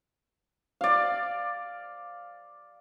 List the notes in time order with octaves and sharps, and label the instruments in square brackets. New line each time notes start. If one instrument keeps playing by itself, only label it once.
[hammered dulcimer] D5 F5